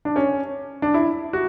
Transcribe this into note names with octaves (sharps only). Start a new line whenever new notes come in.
D4
C#4
D4
E4
F#4